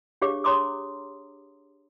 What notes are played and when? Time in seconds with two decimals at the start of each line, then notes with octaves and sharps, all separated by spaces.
0.22 D4 G4 G#4 C#5 F5 D6
0.44 C#5 G#5 A#5 C6 D6 D#6